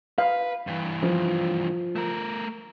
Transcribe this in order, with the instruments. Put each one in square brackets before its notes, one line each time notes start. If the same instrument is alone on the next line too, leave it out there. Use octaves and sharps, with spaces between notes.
[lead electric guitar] B4 [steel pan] F5
[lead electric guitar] G2 E3
[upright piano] F3 F4
[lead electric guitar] A3 A#4